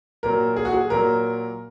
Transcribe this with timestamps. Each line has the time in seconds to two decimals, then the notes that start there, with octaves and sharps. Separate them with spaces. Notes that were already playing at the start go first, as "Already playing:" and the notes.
0.23 A#2 F#3 A#4
0.56 G#4
0.65 F#4
0.72 G#4
0.90 A#2 F#3 A#4